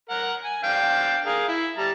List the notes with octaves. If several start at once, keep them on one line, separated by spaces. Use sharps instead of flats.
A#4 F#5
G#5
D4 F5 G5
G#4 A#4 F5
E4
G3 A5 A#5